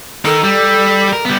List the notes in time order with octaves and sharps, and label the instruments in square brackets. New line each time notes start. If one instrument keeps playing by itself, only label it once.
[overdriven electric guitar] D#4 A#4 [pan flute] A4
[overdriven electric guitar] G3
A#4
G3 B3